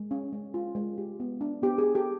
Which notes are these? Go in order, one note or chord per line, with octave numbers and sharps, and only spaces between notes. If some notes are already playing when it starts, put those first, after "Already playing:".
Already playing: G#3
C#4
G#3
F4
G#3
G4
B3
D4
B3 G4
G#4
G4
G4 A4